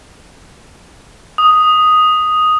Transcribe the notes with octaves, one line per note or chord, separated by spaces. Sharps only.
D#6